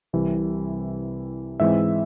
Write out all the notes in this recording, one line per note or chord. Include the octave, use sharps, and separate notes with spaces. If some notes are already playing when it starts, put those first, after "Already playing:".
C2 C3 E3 G3
G#2 E3 G#3 C4 E5